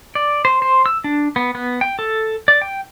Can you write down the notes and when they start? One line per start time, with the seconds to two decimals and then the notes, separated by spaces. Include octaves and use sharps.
0.15 D5
0.45 C5
0.62 C5
0.86 E6
1.04 D4
1.36 B3
1.55 B3
1.81 G5
1.99 A4
2.48 D5
2.62 G5